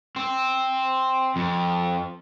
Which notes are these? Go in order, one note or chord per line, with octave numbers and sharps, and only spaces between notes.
C4
F2